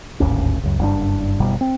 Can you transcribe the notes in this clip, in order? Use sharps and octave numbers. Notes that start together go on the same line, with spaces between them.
D1 G#1 D#2 C#4
C#2 F#2
F#1 G2 D3 D4
F#1 B2 G3
C4